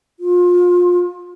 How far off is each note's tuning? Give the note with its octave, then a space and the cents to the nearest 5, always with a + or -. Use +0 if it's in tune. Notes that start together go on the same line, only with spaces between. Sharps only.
F4 +30